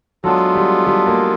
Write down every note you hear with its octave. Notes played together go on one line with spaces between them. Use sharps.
F#3 G#3 B3 D4 F4 A4
G3
G3
A#3